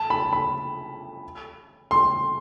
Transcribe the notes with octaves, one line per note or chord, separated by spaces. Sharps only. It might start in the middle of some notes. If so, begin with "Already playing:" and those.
Already playing: A5
B5
B5
C6